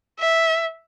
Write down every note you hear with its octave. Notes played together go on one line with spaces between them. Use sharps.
E5